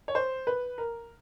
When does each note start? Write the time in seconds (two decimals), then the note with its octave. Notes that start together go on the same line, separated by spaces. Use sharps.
0.08 C#5
0.15 C5
0.47 B4
0.78 A#4